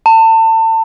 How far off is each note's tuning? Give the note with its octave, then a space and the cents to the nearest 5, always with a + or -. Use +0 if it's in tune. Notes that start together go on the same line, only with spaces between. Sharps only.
A5 +30